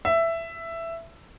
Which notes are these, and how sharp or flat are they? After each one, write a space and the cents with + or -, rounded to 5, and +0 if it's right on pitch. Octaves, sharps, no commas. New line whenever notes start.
E5 +10